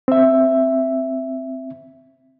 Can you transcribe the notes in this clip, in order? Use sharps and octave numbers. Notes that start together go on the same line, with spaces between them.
C4 E5